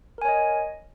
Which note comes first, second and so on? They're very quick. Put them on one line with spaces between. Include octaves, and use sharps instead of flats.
A#4 G#5 C#5 D#5